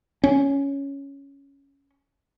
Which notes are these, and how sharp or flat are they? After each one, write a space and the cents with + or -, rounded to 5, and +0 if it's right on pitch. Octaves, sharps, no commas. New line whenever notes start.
C#4 +5